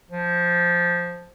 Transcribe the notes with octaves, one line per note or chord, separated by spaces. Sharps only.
F3